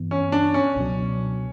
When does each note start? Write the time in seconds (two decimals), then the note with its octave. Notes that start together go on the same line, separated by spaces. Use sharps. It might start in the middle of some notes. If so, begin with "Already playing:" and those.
Already playing: G2 E3 B3
0.11 C#4
0.32 D4
0.54 C#4
0.76 C#2 B2 F#3